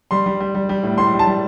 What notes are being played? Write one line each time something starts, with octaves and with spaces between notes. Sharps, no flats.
G3 C6
G3
G3
G3
G3
A2
A2 C6
G3
A5
G3